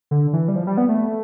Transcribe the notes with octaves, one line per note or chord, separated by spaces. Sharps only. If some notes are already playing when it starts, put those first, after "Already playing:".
D3
E3
G3
F3
G3
B3
A3